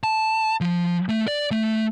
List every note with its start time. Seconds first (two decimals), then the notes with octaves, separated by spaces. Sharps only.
0.04 A5
0.61 F3
1.09 A3
1.28 D5
1.51 A3